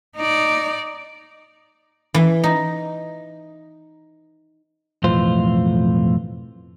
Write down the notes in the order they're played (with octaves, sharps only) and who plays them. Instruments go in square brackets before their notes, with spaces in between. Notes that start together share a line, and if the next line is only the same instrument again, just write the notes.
[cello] D#4 D5
[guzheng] E3
D#4
[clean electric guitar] B1 F2 A2 E3 F4 C5